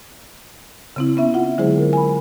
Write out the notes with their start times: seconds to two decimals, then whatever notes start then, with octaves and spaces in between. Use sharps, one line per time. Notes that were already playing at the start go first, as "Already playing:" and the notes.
0.96 C#3 C4 E4
1.17 B3 C#4 E5
1.34 F4 F#5
1.58 D3 F#3 G#3 E4 G#4 C5
1.78 A#4
1.93 G#5 B5